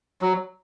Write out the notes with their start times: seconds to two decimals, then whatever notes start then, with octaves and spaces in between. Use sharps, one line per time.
0.22 F#3